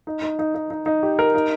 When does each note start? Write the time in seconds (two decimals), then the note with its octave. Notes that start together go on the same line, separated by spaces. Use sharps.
0.07 D#4
0.22 D#4
0.39 D#4
0.55 D#4
0.70 D#4
0.86 D#4
1.03 G4
1.19 A#4
1.35 D#4